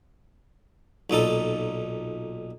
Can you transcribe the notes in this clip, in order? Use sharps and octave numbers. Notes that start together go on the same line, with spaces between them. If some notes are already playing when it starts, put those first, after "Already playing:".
B1 A#2 D#4 A4